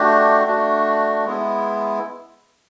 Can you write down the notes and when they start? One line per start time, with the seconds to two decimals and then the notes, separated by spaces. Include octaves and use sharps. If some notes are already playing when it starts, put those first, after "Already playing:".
Already playing: A3 D4 F#4 G4
0.47 A3 D4 F#4
1.25 G#3 B3 E4